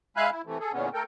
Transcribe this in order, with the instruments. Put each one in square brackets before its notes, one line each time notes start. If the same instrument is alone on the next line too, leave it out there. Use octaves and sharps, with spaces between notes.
[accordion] G#3 E5 F5 G#5 B5 F#6
E4
C3 E3 A3
G#4 A4
E2 A#2 D3 G#3 B3 C#4
A3 A4 A#4 G5